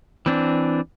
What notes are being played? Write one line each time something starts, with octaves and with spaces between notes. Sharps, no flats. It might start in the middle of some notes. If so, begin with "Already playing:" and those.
E3 C4 D4